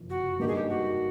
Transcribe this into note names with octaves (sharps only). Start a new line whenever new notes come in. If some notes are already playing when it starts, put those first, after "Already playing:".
Already playing: F#1 F2 C3
F#4
G2 D#3 G3 A#3 D#4 G4
G#4
G4
F#4